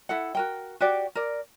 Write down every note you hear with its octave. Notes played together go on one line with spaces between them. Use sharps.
E4 A4 F#5
F#4 A#4 G5
F#4 G4 D5
A#4 D5